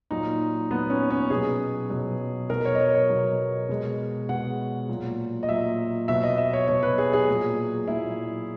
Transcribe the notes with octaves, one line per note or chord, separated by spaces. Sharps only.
A#2 F#3 D#4
A#2 F#3 B3
C#4
C#4
B2 F#3 G#4
B2 F#3
B2 F#3 A#4
C#5
D#5
C#5
C#5
B2 F#3
B2 G#3
B2 G#3 F#5
A#2 F#3
D#5
A#2 F#3 E5
B2 F#3 E5
D#5
E5
C#5
B2 F#3 C#5
B4
G#4
G#4
A#2 F#3
A#2 F#3 E4